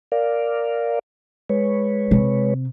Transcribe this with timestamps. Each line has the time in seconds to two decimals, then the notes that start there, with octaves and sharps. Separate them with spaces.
0.12 A#4 D5 F5
1.49 G#3 B4 C#5
2.11 C3